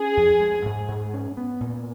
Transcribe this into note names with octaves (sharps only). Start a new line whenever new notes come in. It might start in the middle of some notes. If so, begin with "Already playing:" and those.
Already playing: C#4 G#4
F2
G#3
G#2
G#2
C#4
B3
A#2